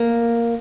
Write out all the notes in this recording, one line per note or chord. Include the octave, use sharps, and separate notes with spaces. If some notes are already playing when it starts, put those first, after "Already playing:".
Already playing: A#3